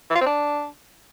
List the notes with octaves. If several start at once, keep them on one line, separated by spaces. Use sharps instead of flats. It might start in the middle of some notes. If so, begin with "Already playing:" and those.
E3
F4
C4
D4